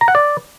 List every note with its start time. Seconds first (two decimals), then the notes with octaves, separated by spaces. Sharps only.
0.01 A#5
0.08 F#5
0.15 D5